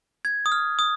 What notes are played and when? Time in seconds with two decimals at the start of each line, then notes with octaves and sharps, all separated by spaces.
0.25 G#6
0.46 D#6
0.52 F6
0.79 D#6